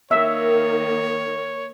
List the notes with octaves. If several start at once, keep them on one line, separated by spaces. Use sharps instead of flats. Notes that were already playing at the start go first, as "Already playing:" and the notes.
D#3 A#3 C#5 E5